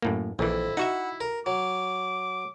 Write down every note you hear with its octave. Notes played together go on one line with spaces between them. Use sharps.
F#2 A2 A#3
A#1 F2 E3 E4
D#4 F#4 E5 F#5
A#4
F#3 D6